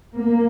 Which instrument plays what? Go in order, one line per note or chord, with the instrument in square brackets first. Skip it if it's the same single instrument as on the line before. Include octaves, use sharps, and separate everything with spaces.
[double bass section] A#3